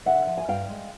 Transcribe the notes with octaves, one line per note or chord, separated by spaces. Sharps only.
D3 E5 F#5
F3
G#5
G2 F5 G5
G#3